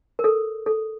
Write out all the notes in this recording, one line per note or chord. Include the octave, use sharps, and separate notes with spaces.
A#4
A4
A4